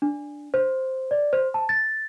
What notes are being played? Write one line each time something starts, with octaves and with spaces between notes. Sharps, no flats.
D4
C5
D5
C5
A5
A6